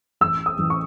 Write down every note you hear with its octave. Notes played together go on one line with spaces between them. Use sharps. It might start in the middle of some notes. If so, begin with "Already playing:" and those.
A1 E6
D#6
A1
C#6